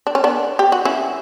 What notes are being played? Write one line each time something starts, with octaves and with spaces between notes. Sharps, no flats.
D4
C#4
B3 D4
G4
F#4
C#4 E4